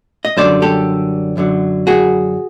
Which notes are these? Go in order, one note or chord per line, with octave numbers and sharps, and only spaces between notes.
D#5
F#2 D3 G3 C5 D5
G4 A4
F#2 D3 F#3
F#4 G#4